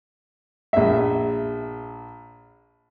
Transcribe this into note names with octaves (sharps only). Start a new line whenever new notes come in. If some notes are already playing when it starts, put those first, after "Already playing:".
A#1 E5